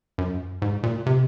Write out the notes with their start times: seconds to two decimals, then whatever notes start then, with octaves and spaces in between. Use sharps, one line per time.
0.18 F#2
0.62 G#2
0.83 A#2
1.06 C3